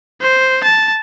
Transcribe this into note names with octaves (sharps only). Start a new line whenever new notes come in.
C5
A5